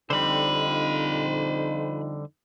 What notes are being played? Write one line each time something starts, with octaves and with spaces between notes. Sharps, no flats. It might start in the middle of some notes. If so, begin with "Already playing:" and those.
F2 D3 G3 C4 D#4 C5 B5